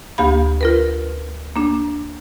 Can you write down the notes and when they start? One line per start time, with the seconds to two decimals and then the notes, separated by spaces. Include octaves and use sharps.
0.18 D2 A#3 G4 F5 B5
0.61 F4 A#4 B4
1.56 A#3 D4